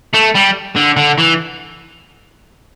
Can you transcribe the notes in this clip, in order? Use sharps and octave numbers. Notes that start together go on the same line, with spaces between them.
A3
G3
D3
D3
E3